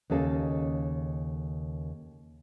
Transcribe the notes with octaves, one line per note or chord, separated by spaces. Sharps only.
D#2 C#3 C#4 A4 D#5 F5